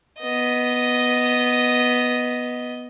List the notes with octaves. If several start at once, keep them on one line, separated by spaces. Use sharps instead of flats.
B3 D#5